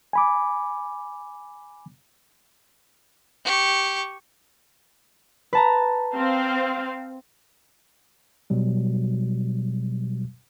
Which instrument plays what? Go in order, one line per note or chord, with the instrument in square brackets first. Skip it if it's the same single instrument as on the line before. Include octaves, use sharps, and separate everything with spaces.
[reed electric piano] G#5 B5 D6
[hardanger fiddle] G4 C#6
[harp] B4 A5 A#5
[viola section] C4 F5
[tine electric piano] B2 F#3 G3